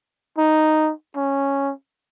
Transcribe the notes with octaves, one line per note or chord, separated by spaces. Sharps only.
D#4
C#4